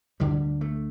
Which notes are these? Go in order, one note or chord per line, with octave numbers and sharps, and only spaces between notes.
D2 D3 G3
A3